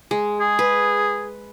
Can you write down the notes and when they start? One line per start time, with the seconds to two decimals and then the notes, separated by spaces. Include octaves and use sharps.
0.11 G#3
0.40 G#4
0.59 B4